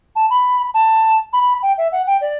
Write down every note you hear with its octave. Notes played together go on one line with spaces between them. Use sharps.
A5
B5
A5
B5
G5
E5
F#5
G5
D5